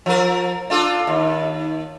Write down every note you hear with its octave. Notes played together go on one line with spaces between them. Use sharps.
F3 A#4
D4 F4 A4
D#2